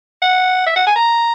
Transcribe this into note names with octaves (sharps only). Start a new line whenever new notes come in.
F#5
E5
F#5
G#5
A#5